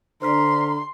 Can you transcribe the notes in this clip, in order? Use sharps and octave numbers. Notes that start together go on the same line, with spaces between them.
D3 C5 A#5 C6 F6 B6